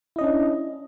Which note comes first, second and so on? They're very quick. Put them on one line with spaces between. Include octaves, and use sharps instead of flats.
E4 D#5 C#4 D4